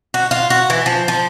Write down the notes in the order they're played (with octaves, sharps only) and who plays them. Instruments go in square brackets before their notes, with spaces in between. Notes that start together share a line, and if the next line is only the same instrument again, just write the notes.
[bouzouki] F#4
F4
F#4
E3
F3
F3